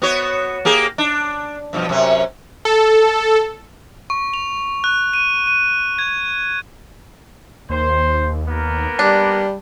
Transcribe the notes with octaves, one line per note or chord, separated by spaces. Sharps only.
B3 F#4 C#5
A#3 G4 G#4
D4
G2 B2 F3
F#2 C3 C#4
A4
C#6
F7
F#6
D#7
D#7
G#6
D#2 C5
A#3 B3 A#4
G3 D4